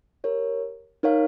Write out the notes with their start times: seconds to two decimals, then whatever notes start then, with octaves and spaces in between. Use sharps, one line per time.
0.24 G4 A#4 C#5
1.03 D#4 A#4 C#5 F5